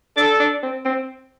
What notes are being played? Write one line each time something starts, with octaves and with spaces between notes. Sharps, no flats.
D4 A4
D4
C4
C4